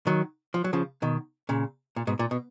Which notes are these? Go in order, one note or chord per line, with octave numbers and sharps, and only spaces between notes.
D#3 F#3
F3
F#3
C#3 F3
B2 D#3
A#2 C#3
A#2
G#2 B2
A#2
B2